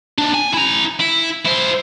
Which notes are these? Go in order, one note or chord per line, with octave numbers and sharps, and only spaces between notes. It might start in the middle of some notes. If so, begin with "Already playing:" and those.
D#2 D4
G#5
E4 A#5
E4
E4 C5